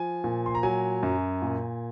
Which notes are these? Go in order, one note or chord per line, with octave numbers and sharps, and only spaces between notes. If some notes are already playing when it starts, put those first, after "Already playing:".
Already playing: F3 G#5
A#2
C6
A#5
F#3 G#5
F#2
A#2